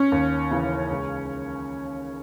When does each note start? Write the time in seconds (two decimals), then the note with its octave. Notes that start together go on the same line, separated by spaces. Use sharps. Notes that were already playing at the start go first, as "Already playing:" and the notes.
Already playing: C#4
0.12 D#2
0.51 C#3 E3
0.90 C#2